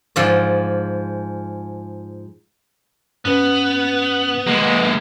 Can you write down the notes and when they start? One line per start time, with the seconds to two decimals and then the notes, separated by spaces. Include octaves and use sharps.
0.16 G#2 F3 D5
3.25 G2 B3 C#4 B4
4.47 G#3 A#3